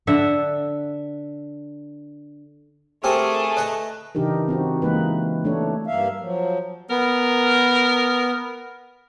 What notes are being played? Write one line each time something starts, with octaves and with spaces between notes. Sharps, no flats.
D3 E5 F#5
A3 C4 G4 G#4 A#4 G#5
B4 D#5 A#5
C#3 E3 D4 D#4 G4 A#4
C4 D#4 F#4
E3 G#3 A#3 D#4 B4
A3 D4 A4 C#5
G2 A#3 E5 F5
F3 F#3
B3 A#4